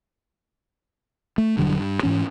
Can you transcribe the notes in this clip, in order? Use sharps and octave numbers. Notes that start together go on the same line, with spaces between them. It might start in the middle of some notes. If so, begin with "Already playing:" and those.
A3
E1 G2 D3 F#3
G2
G#2 E3 C#4